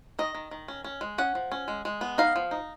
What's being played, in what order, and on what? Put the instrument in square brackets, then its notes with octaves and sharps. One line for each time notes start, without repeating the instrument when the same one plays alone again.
[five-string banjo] D#3 D#5
D#3
D#3
C#4
C#4
G#3
C#4 F#5
F3
C#4
G#3
G#3
B3
D#4 F5
F3
D#4